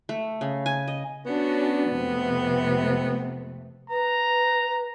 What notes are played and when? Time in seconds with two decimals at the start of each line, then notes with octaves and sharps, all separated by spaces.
0.09 A3
0.41 C#3
0.66 G#5
0.88 D#5
1.26 B3 C#4 D4 F#4
1.90 F2 C3 A3
3.90 B4 A#5